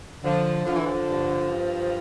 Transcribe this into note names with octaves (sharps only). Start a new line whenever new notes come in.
D3 F3
D3 F3
E3
F3
G2
G2